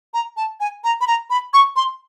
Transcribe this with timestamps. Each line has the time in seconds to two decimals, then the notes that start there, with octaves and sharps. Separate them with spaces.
0.14 A#5
0.37 A5
0.60 G#5
0.84 A#5
1.01 B5
1.07 A#5
1.30 B5
1.54 C#6
1.76 C6